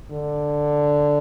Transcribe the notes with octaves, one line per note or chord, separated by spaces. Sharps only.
D3